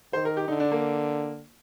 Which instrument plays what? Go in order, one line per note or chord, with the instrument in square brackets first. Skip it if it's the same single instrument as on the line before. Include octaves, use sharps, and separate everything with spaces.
[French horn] D#3 [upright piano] C5
[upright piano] A#4
G4
[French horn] D3 [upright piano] D#4
[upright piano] D4
A#3